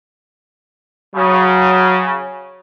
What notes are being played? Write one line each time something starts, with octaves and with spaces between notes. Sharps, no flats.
C#3 F#3